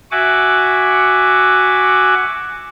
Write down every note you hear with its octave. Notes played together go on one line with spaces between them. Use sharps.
F#4 E5 F#5 G#5 D6